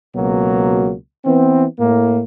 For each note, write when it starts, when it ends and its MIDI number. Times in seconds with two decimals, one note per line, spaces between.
0.15 0.93 37
0.15 0.93 47
0.15 0.93 54
0.15 0.93 58
1.25 1.65 52
1.25 1.65 59
1.25 1.65 60
1.79 2.22 45
1.79 2.22 58